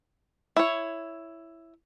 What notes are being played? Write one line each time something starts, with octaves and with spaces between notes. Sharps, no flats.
E4 C#5